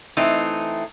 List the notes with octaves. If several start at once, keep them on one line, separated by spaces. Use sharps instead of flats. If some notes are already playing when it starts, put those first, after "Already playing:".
E3 A3 C4 D#4